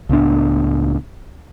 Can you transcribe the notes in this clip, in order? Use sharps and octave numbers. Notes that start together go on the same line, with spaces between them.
C#2 A2 B3 D4